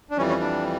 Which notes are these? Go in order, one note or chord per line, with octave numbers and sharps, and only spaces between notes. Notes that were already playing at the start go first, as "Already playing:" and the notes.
D4
F2 E3 G3 C#4
C#4
D4